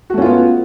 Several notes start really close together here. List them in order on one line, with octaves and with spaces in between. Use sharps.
F#4 A3 C#4 F4 B3